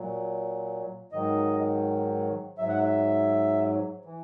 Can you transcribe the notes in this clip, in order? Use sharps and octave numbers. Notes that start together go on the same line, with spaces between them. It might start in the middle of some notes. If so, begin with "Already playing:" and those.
Already playing: A#2 F#3
G#2 D#3 F#3 D#5
G#2 F#3 E5
F#5
E5
E3